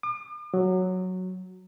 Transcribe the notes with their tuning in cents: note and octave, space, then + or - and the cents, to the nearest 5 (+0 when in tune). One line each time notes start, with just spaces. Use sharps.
D6 +45
F#3 -5